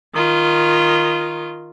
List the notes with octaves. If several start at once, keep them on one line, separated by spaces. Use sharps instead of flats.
D#3 F4